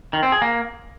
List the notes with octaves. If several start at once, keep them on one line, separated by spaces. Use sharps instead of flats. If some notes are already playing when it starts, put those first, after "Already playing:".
D#3
C4
G#4
A#3